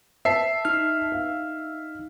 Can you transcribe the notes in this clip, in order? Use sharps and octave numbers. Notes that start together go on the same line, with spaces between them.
C5 E5 A5 C7
D#4 F6
F5